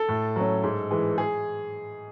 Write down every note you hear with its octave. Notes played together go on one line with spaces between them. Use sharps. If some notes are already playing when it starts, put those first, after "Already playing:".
Already playing: A4
A2
F#3 C#4
G#2
E3 G#3
G#4